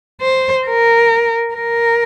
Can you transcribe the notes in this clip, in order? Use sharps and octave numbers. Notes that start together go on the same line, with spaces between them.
C5
A#4
A#4